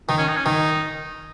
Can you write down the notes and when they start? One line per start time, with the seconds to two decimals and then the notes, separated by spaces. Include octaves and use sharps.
0.09 D#3 D#4
0.18 C#4
0.28 D#4
0.36 C#4
0.45 D#3 D#4